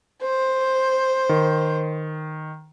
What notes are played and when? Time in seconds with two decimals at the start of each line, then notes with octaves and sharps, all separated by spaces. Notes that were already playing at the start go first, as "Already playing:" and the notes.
0.22 C5
1.29 D#3